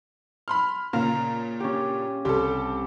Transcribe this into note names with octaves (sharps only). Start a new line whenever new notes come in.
B5 C6 F6
A#2 C#3 F5 A#5
C#4 G4
C2 G4 A4